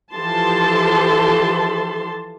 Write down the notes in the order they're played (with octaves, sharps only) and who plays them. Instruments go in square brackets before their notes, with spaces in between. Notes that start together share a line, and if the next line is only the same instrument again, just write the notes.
[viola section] E3 F3 G4 A4 A5 C6